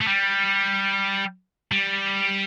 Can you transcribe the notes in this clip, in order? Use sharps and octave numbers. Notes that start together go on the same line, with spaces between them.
A3
G3
G3